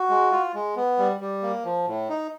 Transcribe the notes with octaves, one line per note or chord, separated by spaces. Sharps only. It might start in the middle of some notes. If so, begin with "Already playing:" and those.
Already playing: F#4
G#3
F4
G#3
B3
G3
G3
A#3
F3
A2
D#4